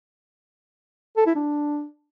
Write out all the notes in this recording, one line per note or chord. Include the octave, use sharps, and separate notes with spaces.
A4
E4
D4